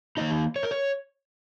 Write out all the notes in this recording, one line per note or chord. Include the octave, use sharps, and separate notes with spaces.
D#3 A#3 D#4 D#5
C#5
A#4
C#5